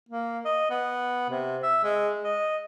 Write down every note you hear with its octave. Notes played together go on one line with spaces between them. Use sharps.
A#3
D#5
B3
C3
E5
G#3
D#5